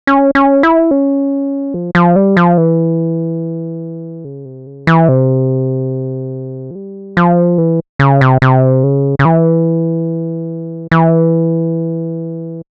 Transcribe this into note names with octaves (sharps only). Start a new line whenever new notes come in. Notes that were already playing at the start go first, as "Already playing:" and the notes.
C#4
C#4
E4
C#4
F3
F3
G3
F3
E3
C#3
C3
C#3
E3
C3
F3
G3
F3
E3
C#3
C3
C3
C#3
C#3
E3
E3